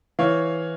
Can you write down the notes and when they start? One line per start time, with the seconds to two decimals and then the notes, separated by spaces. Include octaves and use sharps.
0.19 E3 C#5 F5